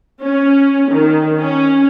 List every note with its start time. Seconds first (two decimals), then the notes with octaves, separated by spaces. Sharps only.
0.23 C#4
0.90 D#3
1.37 C#4